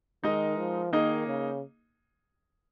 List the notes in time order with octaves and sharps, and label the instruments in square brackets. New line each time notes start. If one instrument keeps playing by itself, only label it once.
[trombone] D#3 [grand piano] G#3 D#4 A#4 D#5
[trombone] F3
[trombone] D#3 [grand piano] A#3 D#4 G#4 D#5
[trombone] C#3